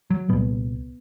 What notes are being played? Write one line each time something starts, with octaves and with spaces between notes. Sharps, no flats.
F#3
C2 A#2 B3